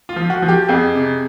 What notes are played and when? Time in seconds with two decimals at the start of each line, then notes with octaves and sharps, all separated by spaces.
0.09 F4
0.16 F3
0.30 F#4
0.42 F3
0.48 G4
0.68 F2 G#4
0.95 C3